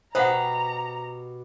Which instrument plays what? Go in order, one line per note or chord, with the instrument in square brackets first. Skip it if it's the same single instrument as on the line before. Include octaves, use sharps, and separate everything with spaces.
[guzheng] B2 G4 B5 [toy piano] C5 F#5 [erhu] A#5